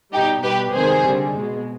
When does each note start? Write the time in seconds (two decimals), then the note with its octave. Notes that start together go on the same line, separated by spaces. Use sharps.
0.13 B2 G3 D#4 G4
0.43 B2 G3 G4 B4
0.73 C3 D#3 G#3 G#4 C5
1.03 D3 G3
1.34 B2 G#3